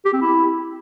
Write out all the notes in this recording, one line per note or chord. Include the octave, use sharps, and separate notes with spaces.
G4
C4
E4